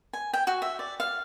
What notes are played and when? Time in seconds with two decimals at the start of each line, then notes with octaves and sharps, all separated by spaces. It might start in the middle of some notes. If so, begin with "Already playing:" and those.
0.13 G#5
0.33 G5
0.47 F#4
0.62 E5
0.79 D5
1.00 F5